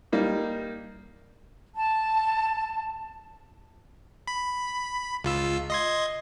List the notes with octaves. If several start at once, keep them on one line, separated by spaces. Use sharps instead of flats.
G3 A#3 D#4
A5
B5
C#2 F4 E6
D#5 C6 G#6